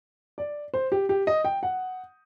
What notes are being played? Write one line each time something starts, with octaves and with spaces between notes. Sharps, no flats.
D5
C5
G4
G4
D#5
G5
F#5